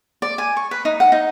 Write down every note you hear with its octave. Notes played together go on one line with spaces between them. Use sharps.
D5
G#5
C#6
B4
D#4
F#5
D#4